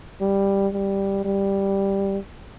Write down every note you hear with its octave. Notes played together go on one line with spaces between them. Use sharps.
G3
G3
G3